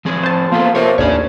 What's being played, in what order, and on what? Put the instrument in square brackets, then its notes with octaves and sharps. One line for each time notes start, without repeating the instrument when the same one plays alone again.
[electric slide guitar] F3 C4 G#4
[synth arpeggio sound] C5 A5
[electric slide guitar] A#3 B3 A4 [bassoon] F4
[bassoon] C3 [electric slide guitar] A#4 C#5
[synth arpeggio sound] A1 D#2 [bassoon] D4 [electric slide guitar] G#4 C#5